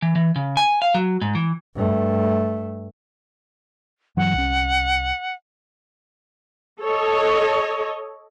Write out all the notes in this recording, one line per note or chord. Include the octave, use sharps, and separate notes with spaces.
E3
E3
C#3
G#5
F5
F#3
G#2
E3
G2 A3
G2 E3 F#3 F#5
C2 C#4
A4 C#5 D#5